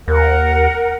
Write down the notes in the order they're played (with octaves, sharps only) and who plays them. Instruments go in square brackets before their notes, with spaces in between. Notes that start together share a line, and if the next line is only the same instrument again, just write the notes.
[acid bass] D#2 [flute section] A#4 F#5